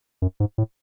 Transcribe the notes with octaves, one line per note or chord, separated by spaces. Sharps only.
F#2
G#2
A2